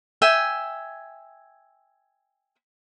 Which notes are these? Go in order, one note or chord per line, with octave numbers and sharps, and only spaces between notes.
E5 G5 G#5